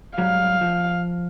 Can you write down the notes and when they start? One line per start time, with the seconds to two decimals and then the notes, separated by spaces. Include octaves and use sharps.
0.18 G#2 F#3 G3 F5
0.61 F3